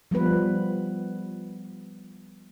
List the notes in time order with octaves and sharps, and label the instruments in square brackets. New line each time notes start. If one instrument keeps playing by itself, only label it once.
[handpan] F3 G3 B3 B4